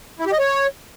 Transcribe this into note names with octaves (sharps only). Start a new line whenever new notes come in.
E4
G4
D#5
C#5